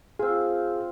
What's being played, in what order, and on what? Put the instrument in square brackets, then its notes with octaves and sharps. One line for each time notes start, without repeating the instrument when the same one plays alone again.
[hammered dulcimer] C4 F4 [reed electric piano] G#4